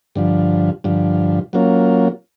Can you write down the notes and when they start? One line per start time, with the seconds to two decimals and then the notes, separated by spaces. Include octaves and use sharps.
0.16 G2 D3 F3
0.84 G2 D3 F3
1.53 F#3 A#3 C#4 F4